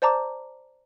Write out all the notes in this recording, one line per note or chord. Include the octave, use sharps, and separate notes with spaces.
C5 D5 A5 A#5 D6